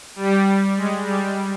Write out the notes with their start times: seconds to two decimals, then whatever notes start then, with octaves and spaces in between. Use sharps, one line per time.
0.16 G3
0.77 G#3
1.06 G3